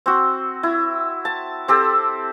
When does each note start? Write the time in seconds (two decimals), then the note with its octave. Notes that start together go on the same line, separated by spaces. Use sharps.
0.06 C4 F#4
0.63 E4
1.25 A5
1.68 C4 G4 A4